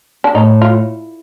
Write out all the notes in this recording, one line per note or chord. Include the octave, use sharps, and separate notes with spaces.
D4
A2 D#4
F4